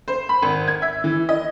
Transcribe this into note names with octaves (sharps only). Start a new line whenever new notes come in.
C5
B5
G#1
G#6
E5
E3
D#5